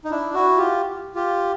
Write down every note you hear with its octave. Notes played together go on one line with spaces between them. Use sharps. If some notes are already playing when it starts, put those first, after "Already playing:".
D#4
D4 E4
E4 F#4
F4 G4
F4 G4